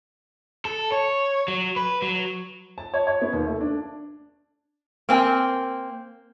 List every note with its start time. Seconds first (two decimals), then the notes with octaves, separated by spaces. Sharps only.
0.65 A4
0.92 C#5
1.48 F#3
1.76 B4
2.02 F#3
2.78 A5
2.94 C#5
3.07 C#5
3.22 B3
3.33 D#2
3.47 A3
3.61 D4
5.09 A#3 C4 G#5